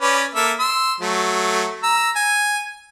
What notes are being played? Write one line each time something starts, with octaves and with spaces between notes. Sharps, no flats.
C#4 B4 D5
A#3 A4 E5
C6 E6
F#3 A3
A#5 E6
G#5